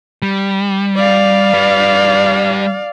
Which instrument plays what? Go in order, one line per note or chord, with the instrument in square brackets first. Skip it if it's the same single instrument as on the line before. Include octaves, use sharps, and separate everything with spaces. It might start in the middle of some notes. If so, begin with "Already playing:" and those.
[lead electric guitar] G3
[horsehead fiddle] D5 F5
[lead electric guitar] G3 B4